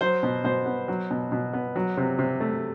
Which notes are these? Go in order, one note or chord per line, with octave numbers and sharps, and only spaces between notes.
F#3 C5
B2
B2 C5
B3
F#3
B2
B2
B3
F#3
C3
C3
A3